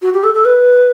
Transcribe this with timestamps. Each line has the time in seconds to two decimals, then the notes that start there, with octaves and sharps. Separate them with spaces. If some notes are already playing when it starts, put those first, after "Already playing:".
0.02 F#4
0.13 G4
0.24 A4
0.34 A4
0.45 B4